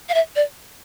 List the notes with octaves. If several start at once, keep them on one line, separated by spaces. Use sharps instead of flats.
F5
E5
D5